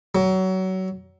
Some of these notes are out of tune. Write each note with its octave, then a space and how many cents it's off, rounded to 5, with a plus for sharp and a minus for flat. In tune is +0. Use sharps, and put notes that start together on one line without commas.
F#3 +25